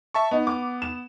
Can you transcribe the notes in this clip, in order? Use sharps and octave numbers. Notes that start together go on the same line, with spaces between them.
E5 A5 C#6
B3 D#4
D6
E7